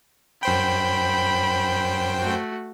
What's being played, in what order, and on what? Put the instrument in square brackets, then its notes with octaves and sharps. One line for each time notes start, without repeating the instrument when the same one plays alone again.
[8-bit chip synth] F#2 C5 G5 [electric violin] B5
[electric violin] A3 F#4